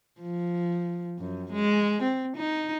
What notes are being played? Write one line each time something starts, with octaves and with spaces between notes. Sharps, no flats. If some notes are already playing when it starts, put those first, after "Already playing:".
F3
F#2
G#3
C4
D#4